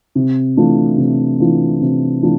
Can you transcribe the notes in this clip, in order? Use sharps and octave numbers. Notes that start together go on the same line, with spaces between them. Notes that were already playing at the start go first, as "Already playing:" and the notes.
C3
E3 A3 D4 F4
C3
E3 A3 D4 F4
C3
E3 A3 D4 F4